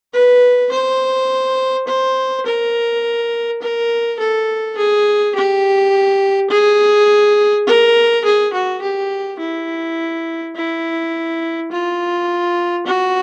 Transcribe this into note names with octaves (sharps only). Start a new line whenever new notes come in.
B4
C5
C5
A#4
A#4
A4
G#4
G4
G#4
A#4
G#4
F#4
G4
E4
E4
F4
F#4